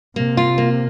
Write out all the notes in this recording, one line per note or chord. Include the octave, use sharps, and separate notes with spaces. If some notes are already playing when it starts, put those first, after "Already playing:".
C3 A#3
F4
A#3